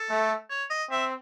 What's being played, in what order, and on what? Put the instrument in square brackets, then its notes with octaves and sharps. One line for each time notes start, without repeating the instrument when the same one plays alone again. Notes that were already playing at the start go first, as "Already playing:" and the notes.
Already playing: [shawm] A4
[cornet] A3
[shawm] C#5
D#5
[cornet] C4 [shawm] E5